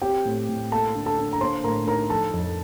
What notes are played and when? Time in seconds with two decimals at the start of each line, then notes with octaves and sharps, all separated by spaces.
0.02 C4 G4 G5
0.25 A2
0.49 A2
0.72 A#3 A4 A5
0.95 D3
1.06 A4 A5
1.19 D3
1.33 A#5
1.41 A#3 C5 C6
1.64 A2 A#4 A#5
1.87 D#4 A#4 A#5
2.10 F3 A4 A5
2.33 F2